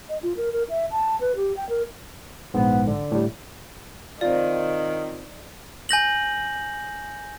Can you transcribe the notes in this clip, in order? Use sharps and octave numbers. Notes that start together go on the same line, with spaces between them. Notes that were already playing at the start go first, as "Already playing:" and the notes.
D#5
F4
A#4
A#4
E5
A5
B4
G4
G5
A#4
A#1 G#2 B3
D3
A2 G3
D#3 C4 F4 D5
G#5 G6 A#6 F#7